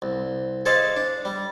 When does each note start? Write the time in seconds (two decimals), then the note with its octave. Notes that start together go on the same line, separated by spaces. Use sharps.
0.02 C2
0.66 G#4 A4 C5 D5 D#5 F5
0.97 D4
1.25 G3